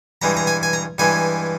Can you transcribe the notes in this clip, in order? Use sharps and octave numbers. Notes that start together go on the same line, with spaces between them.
G2 E3 G#3 A#5
A#5
G#5
G#5
A#5
G2 E3 G#3 G#5